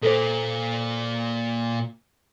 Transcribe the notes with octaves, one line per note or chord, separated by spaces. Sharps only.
A#2 A#3 A4 C5